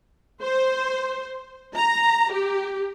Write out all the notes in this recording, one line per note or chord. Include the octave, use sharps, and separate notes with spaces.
C5
A#5
G4